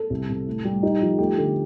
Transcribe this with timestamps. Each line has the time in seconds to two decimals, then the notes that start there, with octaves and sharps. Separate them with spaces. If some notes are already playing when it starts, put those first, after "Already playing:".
Already playing: A4
0.10 C2
0.29 C3
0.47 A2
0.65 G3
0.83 D#4 G4
1.02 F3
1.19 A3 G4
1.37 D3 A4